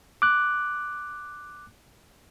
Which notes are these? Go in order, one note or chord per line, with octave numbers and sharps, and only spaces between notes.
D6 F#6